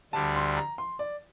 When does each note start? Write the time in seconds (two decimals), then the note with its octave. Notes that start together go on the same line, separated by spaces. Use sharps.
0.13 D2 D3 G3 A5
0.35 C6
0.57 A#5
0.78 C6
0.99 D5